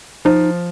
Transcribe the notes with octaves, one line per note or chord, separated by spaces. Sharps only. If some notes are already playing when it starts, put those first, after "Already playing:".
F3 D#4